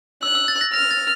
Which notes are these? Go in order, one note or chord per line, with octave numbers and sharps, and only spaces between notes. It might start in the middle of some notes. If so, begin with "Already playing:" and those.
E6 F#6
E6
A6
A#6
F6 A#6
A6